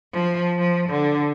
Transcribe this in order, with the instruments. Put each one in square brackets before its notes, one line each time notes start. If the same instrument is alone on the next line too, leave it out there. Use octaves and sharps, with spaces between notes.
[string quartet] F3
F3
D3